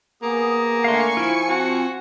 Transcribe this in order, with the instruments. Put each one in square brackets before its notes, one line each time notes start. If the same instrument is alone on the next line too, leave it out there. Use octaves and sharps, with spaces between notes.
[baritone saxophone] A#3 [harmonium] B3 G#4
[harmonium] D3 A3 D4 [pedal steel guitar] F5 C6 [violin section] G#5 C#6 C#7
[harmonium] F3 [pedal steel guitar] E4 F4
[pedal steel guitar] C4 F4 [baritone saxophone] F#4